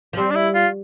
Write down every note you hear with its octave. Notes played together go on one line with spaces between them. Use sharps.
F3
G3 C4
D4
E4
F4